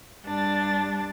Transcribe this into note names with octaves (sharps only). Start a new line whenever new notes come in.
G2 D4 A6